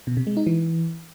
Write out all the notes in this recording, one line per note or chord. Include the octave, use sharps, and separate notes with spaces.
B2
C3
G#3
D#4
E3